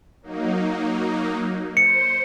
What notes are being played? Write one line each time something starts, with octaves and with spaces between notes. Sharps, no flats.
F#3 A#3 D#4
C5 C#7